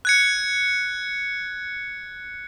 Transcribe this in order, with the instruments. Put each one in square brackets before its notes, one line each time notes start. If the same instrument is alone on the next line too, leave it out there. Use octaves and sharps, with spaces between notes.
[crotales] F#6 G#6 C#7